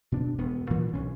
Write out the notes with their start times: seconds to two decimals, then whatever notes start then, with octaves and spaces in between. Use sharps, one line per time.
0.12 B2 D4
0.38 E1 B3
0.70 G2 A#2 E3 F3
0.94 B1 C#4